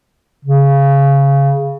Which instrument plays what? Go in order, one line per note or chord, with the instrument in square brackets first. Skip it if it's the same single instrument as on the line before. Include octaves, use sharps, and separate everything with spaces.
[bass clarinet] C#3